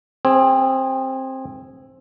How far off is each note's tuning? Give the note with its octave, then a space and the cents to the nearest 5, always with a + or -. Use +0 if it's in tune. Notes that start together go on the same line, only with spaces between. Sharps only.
C4 +15 G#4 -10